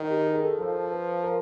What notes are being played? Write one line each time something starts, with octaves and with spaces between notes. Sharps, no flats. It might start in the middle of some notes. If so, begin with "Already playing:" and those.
Already playing: D#3
G4
G#4
A#4
A4
F3 A4
B4
A#4